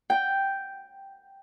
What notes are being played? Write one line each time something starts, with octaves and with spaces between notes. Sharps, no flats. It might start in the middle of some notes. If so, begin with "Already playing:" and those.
G5